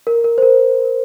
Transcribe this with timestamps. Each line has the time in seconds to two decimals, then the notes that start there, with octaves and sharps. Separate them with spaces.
0.07 A#4
0.24 A#4
0.38 C5
0.42 A#4